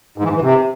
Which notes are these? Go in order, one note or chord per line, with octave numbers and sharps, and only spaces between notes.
G#2
E3
G#2
E3
C3